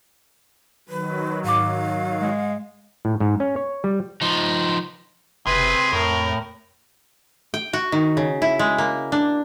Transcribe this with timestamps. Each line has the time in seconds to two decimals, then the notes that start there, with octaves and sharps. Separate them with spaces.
0.89 D#3 F#3 B4
1.44 G#2 F5 D6
2.21 G#3
3.05 A2
3.20 G#2
3.40 C#4
3.56 C#5
3.84 G3
4.22 F3 D#4
5.47 F#1 C3 G#4 B4
5.93 F2 A2 A#4
7.54 G5
7.73 F#4
7.92 D#3
8.17 C#3
8.42 E4
8.59 G#3
8.78 A#3
9.12 D4